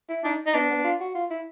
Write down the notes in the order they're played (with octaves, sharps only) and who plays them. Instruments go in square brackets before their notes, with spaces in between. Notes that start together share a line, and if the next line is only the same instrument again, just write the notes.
[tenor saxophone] E4
[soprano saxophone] D4 [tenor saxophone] D#4
[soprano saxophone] D#4
[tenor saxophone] B3 [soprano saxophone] D4
[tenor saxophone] B3
F4
F#4
F4
E4